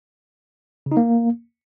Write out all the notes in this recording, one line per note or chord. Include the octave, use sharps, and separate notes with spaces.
C#3
D#4
A#3